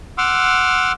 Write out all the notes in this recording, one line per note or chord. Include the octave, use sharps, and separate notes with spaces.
F#5 C6 D6 E6 F6